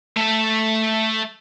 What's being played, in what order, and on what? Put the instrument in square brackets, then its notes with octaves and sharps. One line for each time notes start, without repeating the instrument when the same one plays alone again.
[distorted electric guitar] A3 E5